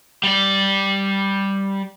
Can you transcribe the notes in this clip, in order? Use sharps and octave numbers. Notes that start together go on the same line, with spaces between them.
G3 D5